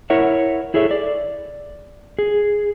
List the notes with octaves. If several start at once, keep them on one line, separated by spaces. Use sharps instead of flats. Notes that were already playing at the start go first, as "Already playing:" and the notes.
E4 A#4 C#5 E5 F#5
E4 G#4 A4 C#5 E5
D5
G#4